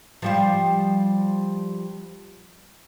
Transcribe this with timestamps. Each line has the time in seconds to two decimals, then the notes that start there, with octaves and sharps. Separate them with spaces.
0.22 F3 G3 C5